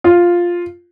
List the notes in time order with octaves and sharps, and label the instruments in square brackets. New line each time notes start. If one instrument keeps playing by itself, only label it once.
[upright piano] F4